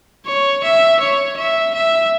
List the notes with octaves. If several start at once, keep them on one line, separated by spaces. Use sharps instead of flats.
C#5
E5
C#5
E5
E5